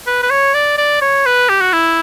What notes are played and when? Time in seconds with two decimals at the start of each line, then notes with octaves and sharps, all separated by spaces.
0.07 B4
0.22 B4
0.30 C#5
0.54 D5
0.78 D5
1.01 C#5
1.26 B4
1.49 G4
1.61 F#4
1.73 E4